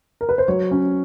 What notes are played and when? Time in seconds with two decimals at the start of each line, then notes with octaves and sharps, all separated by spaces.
0.21 A#4
0.29 B4
0.38 C5
0.48 F#3 C#5
0.71 C#4